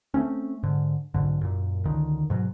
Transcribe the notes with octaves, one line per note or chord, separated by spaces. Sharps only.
A3 A#3 C4 C#4
G#2 D3
B1 G#2 D3
F#2 A#2
C#2 D3 D#3
G#2 B2 F#3